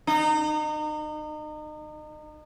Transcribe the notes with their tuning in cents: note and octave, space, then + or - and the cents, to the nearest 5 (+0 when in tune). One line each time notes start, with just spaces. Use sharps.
D#4 -35